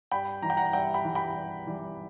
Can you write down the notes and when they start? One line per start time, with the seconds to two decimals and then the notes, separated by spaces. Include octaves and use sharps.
0.12 G2 G5 B5
0.42 E3 G3 A#5
0.50 G5
0.57 F#5 A#5
0.73 G2 E5 G5
0.94 G5 B5
1.05 E3 G3
1.15 G5 B5
1.35 G2
1.67 E3 G3